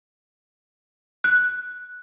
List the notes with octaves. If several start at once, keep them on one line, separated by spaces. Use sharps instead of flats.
F#6